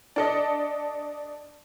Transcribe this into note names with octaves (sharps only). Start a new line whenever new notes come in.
D4 A4 D#5